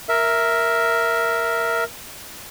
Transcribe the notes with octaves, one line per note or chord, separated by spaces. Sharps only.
A#4 E5